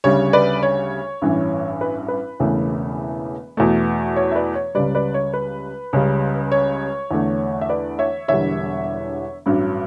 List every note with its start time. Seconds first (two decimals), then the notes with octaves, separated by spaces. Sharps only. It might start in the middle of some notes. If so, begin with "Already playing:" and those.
0.04 D2 C#3 G3 C#5
0.33 B4 D5
0.63 C#5
1.22 A1 G2 E3
1.81 B4
2.08 B4
2.39 E1 E2 C#3 E3 A3
3.57 E2 B2 A3
4.16 C#5
4.32 E5
4.36 B4 D5
4.55 C#5
4.75 C#2 C#3 G3 B4 D5
4.95 B4 D5
5.14 C#5
5.34 B4
5.93 C#2 C#3 G3
6.52 C#5
7.11 E2 D3 A3
7.61 E5
7.69 B4 D5
7.99 C#5 E5
8.28 E1 E2 D3 G3 C#5 E5
9.46 A1 G2 F#3